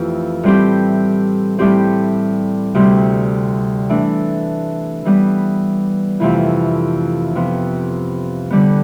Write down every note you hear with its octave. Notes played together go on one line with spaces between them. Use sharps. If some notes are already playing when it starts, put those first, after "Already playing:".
Already playing: F2 E3 A3 E4 G4
A2 G3 C4 E4 G4
A2 G3 C4 G4
D2 C3 G3 C4
E3 A3 D4
E3 G3 B3
F2 C3 E3 A3 E4
C3 F3 B3
D3 G3 B3